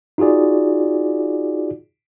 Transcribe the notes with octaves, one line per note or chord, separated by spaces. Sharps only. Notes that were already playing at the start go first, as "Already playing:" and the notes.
D#4 F4 F#4 G#4 D5